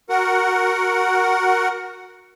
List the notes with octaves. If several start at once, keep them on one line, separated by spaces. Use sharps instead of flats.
F#4 A#4 F#5